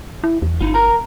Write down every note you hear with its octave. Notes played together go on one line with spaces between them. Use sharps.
E4
E2
G1 D#4 F4
A#4 A#5